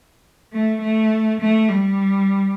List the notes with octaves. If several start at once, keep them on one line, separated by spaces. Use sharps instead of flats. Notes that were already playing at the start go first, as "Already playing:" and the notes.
A3
A3
A3
G3